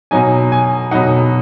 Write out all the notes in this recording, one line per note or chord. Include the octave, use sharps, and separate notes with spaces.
B2 F#3 D#4 G#5
G#5
B2 F#3 D#4 F#5